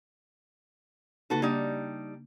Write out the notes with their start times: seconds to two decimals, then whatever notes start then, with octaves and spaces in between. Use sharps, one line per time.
1.30 C#3 A#3 D#4 F#4 A4 B4
1.42 G3 A#3 D4 D#4 G#6